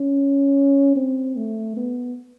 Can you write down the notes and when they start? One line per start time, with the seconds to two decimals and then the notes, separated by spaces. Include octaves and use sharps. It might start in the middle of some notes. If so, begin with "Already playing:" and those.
Already playing: C#4
0.96 C4
1.36 A3
1.76 B3